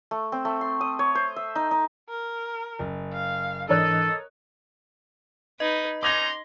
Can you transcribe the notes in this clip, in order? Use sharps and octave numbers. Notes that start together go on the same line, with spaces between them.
A3
C4
A3
C6
D#6
C#5
C5
E5
D#4
D#4
A#4
F#1
F5
G#2 E3 D4 A4 A#4 C#5 D#5 F#6
D#4 B4 D#5
C#4 D#4 A#5 C6 D6 G#6 A#6